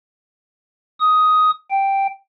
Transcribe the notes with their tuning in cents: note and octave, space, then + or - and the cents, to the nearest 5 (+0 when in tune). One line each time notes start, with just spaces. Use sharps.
D#6 +10
G5 +0